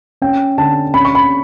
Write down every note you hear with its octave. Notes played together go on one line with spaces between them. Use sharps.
C#4 G5
D3 A5
C#4 B5
C#6
B5